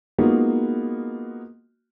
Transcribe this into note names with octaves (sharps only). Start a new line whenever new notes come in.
G#3 A#3 B3 D#4 F4 F#4